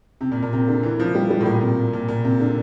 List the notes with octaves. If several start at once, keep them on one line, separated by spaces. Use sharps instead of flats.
C3
A#2
A#2
C3
D3
E3
F3
G3
G3
A2
A#2
C3
A#2
A#2
C3
D3